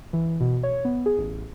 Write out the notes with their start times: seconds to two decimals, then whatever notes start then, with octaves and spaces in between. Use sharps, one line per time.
0.13 E3
0.41 B2
0.63 C#5
0.85 B3
1.06 G#4
1.18 A1